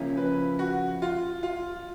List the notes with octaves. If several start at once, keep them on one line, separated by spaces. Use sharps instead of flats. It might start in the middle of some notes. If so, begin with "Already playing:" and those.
Already playing: C#3 F3 A#3 C#4 E4
B4
F#4
F4
F4